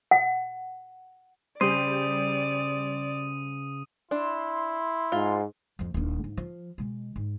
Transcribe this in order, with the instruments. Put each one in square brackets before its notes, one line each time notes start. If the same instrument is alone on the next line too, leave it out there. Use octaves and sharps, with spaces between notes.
[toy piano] F#5
[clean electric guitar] C#3 C5 [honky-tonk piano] G3 G4 G#4 [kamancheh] D5 [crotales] D#6 D#7
[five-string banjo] D4 [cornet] E4 [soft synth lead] C6
[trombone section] G#2 [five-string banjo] F4
[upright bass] F2 F3
D#1 D4
G#2
F3
B2 G#3
G#2